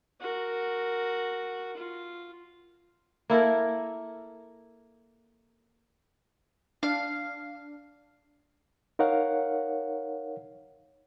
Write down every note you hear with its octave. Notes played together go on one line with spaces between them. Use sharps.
F#4 A#4
F4
A#3 E4 A4 A#4
D4 F5
D#4 A#4 C#5 F5 F#5